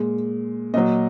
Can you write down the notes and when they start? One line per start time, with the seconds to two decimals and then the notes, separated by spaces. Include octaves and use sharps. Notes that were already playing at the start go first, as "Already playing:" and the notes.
Already playing: A#2 G#3
0.74 A#2 F#3 D#5